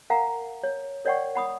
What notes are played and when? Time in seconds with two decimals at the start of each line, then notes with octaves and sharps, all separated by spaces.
0.10 A#4 F5 F#5 G#5 A#5
0.63 C#5
1.05 A#4 C#5 D5 F#5 G5 C#6
1.35 F#5 B5 D#6